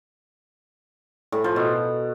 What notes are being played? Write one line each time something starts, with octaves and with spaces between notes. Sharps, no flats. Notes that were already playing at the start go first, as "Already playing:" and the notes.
A2
F3
B2